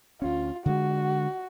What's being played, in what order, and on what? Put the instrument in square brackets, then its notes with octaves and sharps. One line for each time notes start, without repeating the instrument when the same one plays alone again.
[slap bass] D2 C#4 [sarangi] F4
[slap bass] D3 G#3 [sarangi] F#4